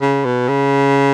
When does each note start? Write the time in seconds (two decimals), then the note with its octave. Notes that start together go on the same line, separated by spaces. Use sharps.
0.01 C#3
0.25 B2
0.48 C#3